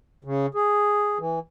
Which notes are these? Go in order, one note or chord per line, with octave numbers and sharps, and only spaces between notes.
C#3
G#4
E3